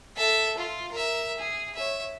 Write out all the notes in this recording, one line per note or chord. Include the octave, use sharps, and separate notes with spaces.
A4 E5
F4
A#4 E5
G#4
C#5 E5